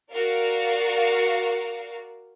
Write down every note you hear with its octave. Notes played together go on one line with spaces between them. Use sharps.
F#4 A#4 D5 F5